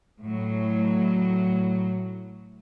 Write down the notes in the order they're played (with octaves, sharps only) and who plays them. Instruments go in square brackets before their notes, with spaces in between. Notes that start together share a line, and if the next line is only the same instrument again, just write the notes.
[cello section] A2 F#3